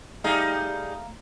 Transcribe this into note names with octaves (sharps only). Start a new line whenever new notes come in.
G3 A3 D#4 G#4 F5 A#5